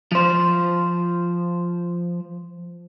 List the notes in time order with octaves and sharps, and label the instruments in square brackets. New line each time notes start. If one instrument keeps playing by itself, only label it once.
[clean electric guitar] F3 C5